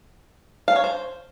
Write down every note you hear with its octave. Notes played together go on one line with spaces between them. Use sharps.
F5
C#5
C5